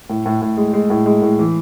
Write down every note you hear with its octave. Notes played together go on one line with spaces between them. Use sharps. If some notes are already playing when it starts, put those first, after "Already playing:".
A2
A2
A2
G#3
G#3
A2
G#3
A2
E3